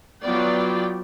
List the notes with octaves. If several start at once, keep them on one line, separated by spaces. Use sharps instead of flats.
F#3 B3 F4 D5 G5